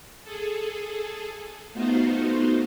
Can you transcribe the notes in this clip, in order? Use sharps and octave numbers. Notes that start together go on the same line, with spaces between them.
G#4 A4
A3 B3 D#4 F4 F#4 C5